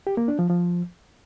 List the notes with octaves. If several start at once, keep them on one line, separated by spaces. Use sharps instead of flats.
G4
A#3
D4
F3
F3